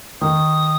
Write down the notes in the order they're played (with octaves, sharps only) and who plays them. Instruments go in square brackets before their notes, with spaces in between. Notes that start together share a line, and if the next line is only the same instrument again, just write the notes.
[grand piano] D#3 [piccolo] D#6